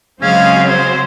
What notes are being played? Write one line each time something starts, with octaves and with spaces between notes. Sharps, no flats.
C#3 F#3 G#3 C4 C#4 F5
C5